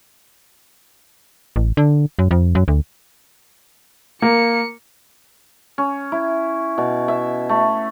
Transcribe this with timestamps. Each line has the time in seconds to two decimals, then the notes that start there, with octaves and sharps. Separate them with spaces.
1.56 A1
1.77 D3
2.19 F#2
2.31 F2
2.55 F#2
2.68 D2
4.22 A#3 C#7
5.78 C#4
6.12 E4
6.78 B2
7.08 E5
7.49 A3